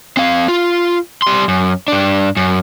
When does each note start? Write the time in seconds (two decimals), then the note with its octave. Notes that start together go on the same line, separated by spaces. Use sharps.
0.17 C4 F5
0.48 F4
1.22 G3 C6
1.48 F#2
1.88 G2 D4
2.37 F#2